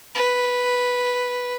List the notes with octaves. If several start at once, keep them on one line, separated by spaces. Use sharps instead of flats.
B4